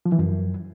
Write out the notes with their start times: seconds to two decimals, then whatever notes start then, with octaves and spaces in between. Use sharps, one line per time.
0.06 F3
0.12 E3
0.19 F#2